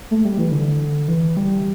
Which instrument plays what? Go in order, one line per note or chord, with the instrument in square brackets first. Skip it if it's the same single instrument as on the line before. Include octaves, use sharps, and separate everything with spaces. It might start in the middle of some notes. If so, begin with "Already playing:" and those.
[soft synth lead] A3
G3
E3
D3
E3
G3